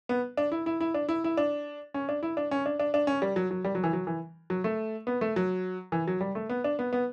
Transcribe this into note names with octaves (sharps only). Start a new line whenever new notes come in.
B3
D4
E4
E4
E4
D4
E4
E4
D4
C#4
D4
E4
D4
C#4
D4
D4
D4
C#4
G3
F#3
F#3
G3
F#3
E3
F#3
E3
F#3
A3
B3
A3
F#3
E3
F#3
G3
A3
B3
D4
B3
B3